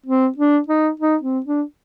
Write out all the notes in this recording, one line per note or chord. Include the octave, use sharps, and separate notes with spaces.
C4
D4
D#4
D#4
C4
D4